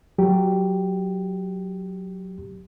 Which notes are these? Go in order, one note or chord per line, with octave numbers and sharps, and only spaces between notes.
F#3 G4